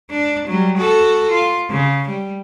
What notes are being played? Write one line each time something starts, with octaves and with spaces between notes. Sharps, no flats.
D4
F#3 G3
F#4 A4
F4
C#3
G3